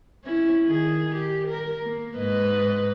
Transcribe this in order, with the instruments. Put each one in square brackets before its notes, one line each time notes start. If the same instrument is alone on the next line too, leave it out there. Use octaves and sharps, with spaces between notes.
[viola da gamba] C#4 E4
D#3 G#4
G4
A#4
A#3
G#2 B4 D#5